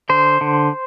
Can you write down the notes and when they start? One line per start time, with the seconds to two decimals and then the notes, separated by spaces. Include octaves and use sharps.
0.09 D3 C5
0.41 D3